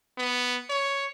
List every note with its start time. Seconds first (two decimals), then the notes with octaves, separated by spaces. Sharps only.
0.18 B3
0.70 C#5